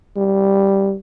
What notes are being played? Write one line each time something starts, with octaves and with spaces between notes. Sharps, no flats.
G3